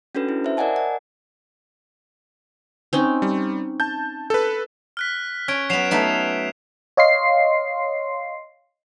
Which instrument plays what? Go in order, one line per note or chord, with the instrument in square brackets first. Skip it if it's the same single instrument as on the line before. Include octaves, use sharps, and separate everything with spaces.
[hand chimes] C#4 D4 F#4 A4 B4
E4
C5 E5
A#4 D5 D#5 F#5 G#5 A5
F#5
[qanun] C4 C#4 D#4
[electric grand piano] G3
A5 G6
A4 B4
[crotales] F6 F#6 B6
[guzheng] C#4 [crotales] F6 G#6 D7
[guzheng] F#3 B3 [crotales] C7 E7 F7
[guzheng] A3 B3 D#4
[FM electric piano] C#5 D#5 F5 C6 C7